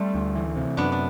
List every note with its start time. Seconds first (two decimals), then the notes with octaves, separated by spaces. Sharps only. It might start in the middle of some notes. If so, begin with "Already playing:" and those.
Already playing: G3 A3 C4 D4
0.15 D2
0.35 E3
0.56 C3
0.77 F#2 B3 D4
0.92 D4